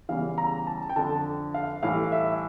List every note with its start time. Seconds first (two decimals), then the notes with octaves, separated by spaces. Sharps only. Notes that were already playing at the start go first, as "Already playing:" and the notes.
0.09 E2 C#3 E3 G3 F5
0.38 A#5
0.67 A5
0.89 G5
0.96 F2 D3 F3 A5
1.54 F5
1.83 A2 E3 G3 F5
2.12 E5